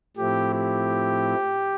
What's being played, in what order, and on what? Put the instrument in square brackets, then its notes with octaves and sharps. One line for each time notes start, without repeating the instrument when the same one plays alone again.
[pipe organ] A2 F3 A3 C4 E4 [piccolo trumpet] G4
[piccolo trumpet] G4